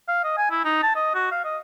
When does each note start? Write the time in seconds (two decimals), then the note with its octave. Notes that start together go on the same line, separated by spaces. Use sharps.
0.08 F5
0.24 D#5
0.37 G#5
0.51 E4
0.65 D#4
0.83 A5
0.95 D#5
1.15 F#4
1.31 F5
1.44 D#5